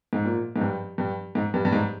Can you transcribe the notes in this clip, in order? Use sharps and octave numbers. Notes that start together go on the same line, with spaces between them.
G#2
A#2
G#2
G2
G2
G#2
G2
G2
G#2